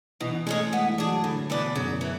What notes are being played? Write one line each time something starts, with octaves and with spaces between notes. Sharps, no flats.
B2 E3
G#3 A3 C#4 G#4
G#3 B3
E3
D4 G#4
F#3
A2 D3
B2 E3 B3 D4
F#2 C#3
E3